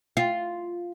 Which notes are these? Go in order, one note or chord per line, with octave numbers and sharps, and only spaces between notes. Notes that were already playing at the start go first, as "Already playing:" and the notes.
F4